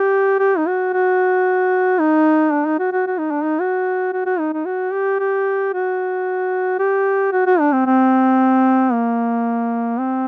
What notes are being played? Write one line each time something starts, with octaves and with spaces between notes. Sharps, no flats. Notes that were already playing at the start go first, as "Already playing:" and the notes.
Already playing: G4
G4
D#4
F#4
F#4
D#4
D4
D#4
F#4
F#4
F#4
D#4
D4
D#4
F#4
F#4
F#4
D#4
D#4
F#4
G4
G4
F#4
G4
F#4
F#4
D4
C4
C4
A#3
C4